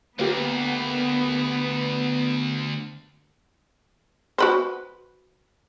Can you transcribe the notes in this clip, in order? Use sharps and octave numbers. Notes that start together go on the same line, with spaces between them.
D2 A#3 B3 G4
F#4 B4 C5